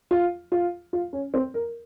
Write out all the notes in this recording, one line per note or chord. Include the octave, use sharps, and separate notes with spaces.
F4
F4
F4
C#4
C4
A#4